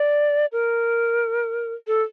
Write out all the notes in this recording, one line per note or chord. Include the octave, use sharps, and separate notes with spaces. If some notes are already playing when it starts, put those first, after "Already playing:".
Already playing: D5
A#4
A4